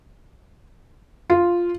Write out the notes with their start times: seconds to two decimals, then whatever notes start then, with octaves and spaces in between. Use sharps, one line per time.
1.30 F4